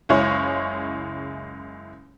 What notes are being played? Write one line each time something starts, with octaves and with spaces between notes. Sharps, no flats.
F#1 C#2 G#3 E4 C#5